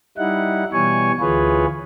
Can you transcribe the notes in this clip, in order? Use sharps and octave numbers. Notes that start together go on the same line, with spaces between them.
G3 D#4 E4 F#5
B2 E3 G3 C#5 G#5 C#6
D2 E3 F4 G#4 B4 C#5